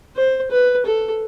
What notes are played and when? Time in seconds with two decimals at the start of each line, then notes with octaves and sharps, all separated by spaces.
0.16 C5
0.51 B4
0.86 A4